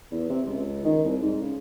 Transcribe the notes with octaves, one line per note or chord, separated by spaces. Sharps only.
E2
C3
C#2
D#3
C2
G#2
C#3